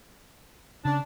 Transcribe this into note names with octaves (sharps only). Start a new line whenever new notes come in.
C#3 D4